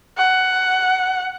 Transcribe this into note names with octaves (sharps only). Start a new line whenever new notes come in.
F#5